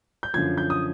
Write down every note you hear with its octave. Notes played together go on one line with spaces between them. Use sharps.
G6
F#2 D3 F3 G#6
G6
D#6